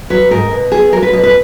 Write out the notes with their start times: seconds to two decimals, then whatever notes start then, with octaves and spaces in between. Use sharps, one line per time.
0.10 F#3 B4
0.31 G#2 A#4
0.51 B2
0.72 B3 G#4
0.92 F#3 A#4
1.02 B4
1.13 B2 B4
1.23 B4